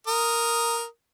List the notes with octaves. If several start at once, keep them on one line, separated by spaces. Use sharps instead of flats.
A#4 D#6